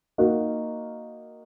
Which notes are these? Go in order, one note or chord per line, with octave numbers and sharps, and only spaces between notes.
A#3 D#4 F#4 A#4